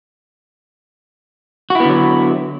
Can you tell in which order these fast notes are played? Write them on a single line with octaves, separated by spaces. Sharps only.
F#4 E4 B3 D3 F#3